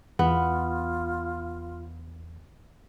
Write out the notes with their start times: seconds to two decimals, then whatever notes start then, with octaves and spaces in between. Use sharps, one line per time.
0.19 E2 B3 F4